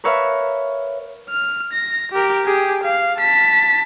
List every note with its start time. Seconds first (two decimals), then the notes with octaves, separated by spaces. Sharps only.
0.04 A#4 B4 C#5 E5 F5
1.29 F6
1.73 A#6
2.12 G4 A#4
2.46 G4 G#4
2.84 F5
3.19 A5 B6